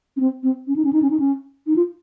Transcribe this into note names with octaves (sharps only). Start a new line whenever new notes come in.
C#4
C4
C4
C#4
D#4
C#4
D#4
C#4
D#4
C#4
D#4
F4